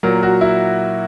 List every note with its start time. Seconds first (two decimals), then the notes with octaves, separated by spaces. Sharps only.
0.03 A#2 F#3 A#4
0.23 F#4
0.41 E4